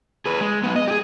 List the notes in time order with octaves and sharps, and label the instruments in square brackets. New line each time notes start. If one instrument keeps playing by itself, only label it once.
[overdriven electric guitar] G#4 B4
G#3
F#3 B3
D#5
G4 G#4